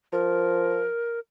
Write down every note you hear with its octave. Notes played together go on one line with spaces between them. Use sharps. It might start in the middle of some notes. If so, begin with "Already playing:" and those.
F3 A#4